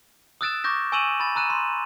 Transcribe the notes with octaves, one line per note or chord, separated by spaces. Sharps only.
D#6 E6 F#6 A6 D7 E7
C#6 D6 G6 A#6
G#5 C#6 E6 D#7 E7 F#7
B5 A6
A#5 E6 F#6 D#7 E7
C6